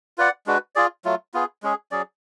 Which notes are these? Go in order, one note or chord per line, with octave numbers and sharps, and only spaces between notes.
F4 B4 D5 F#5
G#3 D4 F#4 B4
F4 G#4 D5
F#3 A3 F4
B3 F4 G#4
G#3 C#4 G#4
F#3 C#4 G#4 D5